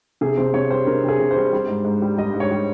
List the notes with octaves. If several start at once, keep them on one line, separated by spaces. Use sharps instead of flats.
C3 G#4
C3 C5
C3 C#5
G3 C5
C3 A#4
C3 G#4
C3
C5
G3
G3
G#2
G#2
G3
G3 D#5
G#2
C#5
G3